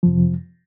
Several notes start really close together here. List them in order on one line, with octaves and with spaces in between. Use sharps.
F3 F2 C3